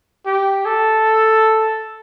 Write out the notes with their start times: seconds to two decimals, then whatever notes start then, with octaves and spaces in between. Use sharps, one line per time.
0.26 G4
0.65 A4